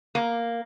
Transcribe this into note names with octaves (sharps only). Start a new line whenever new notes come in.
A#3